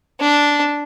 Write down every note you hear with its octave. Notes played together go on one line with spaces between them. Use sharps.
D4